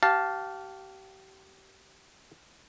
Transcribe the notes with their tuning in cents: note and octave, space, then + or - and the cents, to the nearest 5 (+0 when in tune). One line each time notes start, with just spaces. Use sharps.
G4 -30 F5 +0 A5 +0